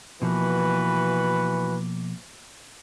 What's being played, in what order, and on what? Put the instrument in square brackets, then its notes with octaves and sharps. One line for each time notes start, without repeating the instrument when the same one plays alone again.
[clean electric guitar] B2 F3 A#3 [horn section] E3 F#4 B4